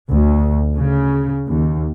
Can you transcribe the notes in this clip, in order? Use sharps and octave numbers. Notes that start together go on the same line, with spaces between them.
D2
C#3
D#2